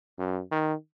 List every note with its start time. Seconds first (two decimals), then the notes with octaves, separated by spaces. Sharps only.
0.19 F#2
0.51 D#3